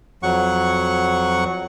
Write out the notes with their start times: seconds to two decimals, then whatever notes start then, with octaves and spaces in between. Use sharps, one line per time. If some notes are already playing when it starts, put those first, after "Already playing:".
0.23 F2 F#3 F#5 C#6